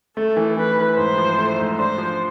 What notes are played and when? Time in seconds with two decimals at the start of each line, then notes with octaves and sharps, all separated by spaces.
0.16 A3 A4
0.37 E3
0.56 E3 B4
0.78 E3
0.97 G#2 C5
1.18 F3
1.38 A3
1.58 G#2
1.78 D4 C5
1.98 F3